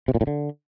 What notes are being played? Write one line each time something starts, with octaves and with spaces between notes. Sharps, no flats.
C3
A#2
A2
D3